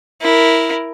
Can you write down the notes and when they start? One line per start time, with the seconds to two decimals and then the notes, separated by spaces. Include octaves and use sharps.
0.22 E4 A#4